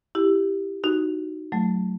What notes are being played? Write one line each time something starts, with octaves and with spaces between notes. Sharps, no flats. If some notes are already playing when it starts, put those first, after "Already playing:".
E4 G4
D#4 F#4
F#3 A3